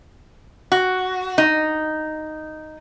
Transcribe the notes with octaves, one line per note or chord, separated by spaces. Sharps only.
F#4
D#4